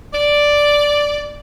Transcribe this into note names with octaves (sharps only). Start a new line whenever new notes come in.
D5